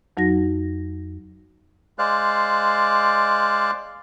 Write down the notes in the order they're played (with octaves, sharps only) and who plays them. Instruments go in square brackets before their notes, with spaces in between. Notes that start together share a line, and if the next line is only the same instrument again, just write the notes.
[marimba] F2 F#3 D#4 F#4 A#6
[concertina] G#3 C5 D5 F5 F#6